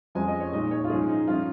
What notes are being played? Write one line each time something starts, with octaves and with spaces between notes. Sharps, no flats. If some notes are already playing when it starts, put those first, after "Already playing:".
F2 F3 G#3 C#4 G#5
D#5
C#5
A#2 G#3 D#4 D#5
C#5
F4
G#2 F3 C#4 G#4
D#4
F3 C#4 F4